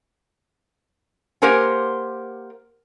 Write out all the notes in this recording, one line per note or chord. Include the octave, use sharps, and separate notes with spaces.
A#3 G4 A#4 C5 F#5 G#5